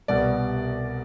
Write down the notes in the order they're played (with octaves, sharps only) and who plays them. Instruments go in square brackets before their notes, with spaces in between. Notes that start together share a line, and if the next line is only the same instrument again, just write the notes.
[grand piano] C2 B2 G3 B3 D5